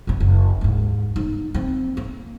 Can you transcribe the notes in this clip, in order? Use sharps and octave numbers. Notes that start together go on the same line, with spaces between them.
F#1 A#2
F#1
D#2 G#2
G1 D#4
A#3 C4
A#3